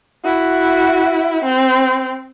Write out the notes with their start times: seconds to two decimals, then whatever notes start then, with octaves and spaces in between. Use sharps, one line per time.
0.24 E4 F#4
1.44 C4